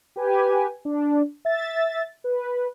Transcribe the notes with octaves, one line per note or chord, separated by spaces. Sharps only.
G4 B4 G#5
D4
E5 A6
B4